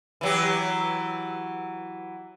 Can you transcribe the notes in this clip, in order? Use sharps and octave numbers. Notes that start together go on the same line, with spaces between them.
E3 F#3 G4